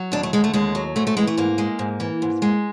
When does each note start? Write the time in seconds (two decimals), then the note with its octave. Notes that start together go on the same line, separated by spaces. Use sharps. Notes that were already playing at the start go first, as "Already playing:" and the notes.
Already playing: F#3
0.12 D#2 D4
0.23 A3
0.33 D3 G#3
0.44 A3
0.53 D#2 G#3
0.75 F#3
0.96 G#2 A3
1.07 A3
1.17 E3 G#3
1.27 A3
1.37 G#2 A#3
1.58 G#3
1.79 G#2
2.00 E3
2.22 G#2
2.42 G#3